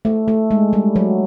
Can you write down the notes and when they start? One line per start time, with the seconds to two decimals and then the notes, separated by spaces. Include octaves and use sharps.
0.05 A3
0.28 A3
0.51 G#3
0.73 G3
0.96 F#3